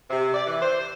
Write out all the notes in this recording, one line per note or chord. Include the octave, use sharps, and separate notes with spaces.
C3
D5
E3
C5